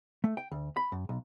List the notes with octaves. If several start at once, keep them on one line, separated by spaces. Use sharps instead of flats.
A3
G5
D2
B5
F#2
B1